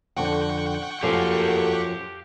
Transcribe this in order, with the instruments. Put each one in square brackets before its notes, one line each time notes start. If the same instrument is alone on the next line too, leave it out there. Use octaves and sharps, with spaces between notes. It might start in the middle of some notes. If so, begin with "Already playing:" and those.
[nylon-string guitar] F2 D3 [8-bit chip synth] F#5 G5 C#6
[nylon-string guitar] F#2 F3 [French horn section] A#3 F#4 A4 [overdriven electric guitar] G4 F5